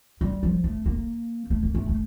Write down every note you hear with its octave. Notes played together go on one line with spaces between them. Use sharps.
G3
F3
A3
A#3
A3
A#3
A3
A3